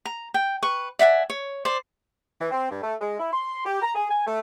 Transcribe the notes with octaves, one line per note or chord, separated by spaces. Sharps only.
A#5
G5
B4 C#6
D5 E5 F#5 G#5
C#5
C5 D5
E3
C4
G2
A3
G#3
E4
C6
G4
A#5
G#4
G#5
A3